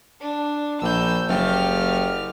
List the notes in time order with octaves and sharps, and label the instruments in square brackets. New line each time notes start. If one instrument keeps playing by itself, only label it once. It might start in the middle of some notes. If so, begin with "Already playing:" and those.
[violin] D4
[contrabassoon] A#1 [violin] E6 G6
[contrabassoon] F#1 [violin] G4 F6